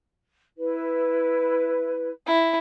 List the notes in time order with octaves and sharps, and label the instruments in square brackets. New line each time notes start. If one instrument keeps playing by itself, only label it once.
[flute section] E4 B4
[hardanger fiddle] E4